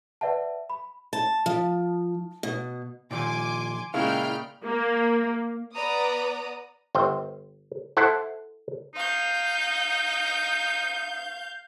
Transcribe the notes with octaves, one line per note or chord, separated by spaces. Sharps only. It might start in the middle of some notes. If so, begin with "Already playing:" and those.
B4 D5 E5 F#5 A5
B5
A5
F3
B2
A#2 D#3 F3 G#5 C6 D6
A#2 C#3 G#3 E4 F5 G5 B5 F6
A#3
B3 B4 D5 A#5 D#6
G1 C5 G5
E4 A4 C5 F#5
D#4 F5 G6